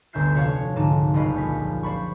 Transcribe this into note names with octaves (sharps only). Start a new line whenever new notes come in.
G1 D2 E5 G6 C7
F1 F#4 C#5 F5 A5 G#6
C#2 G#2 D3 D#4 A5 D6
F#1 G3 G4 D#5 F5 B5
A#1 C#4 B6
C5 D5 B5 C#6